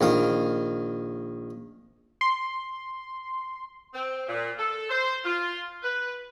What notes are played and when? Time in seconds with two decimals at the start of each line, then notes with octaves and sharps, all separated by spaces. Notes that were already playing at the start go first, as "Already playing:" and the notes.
0.01 A#1 D#3 F5
2.21 C6
3.94 C4
4.28 A#2
4.58 A4
4.90 C5
5.24 F4
5.83 B4